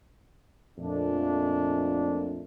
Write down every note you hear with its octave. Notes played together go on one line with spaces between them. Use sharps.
F2 A#2 A3 D4